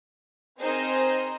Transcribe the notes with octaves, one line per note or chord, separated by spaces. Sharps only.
C4 D#4 G#4 A#4 C5 D#5